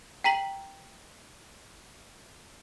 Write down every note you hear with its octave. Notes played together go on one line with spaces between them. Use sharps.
G5 A#5 B6 F#7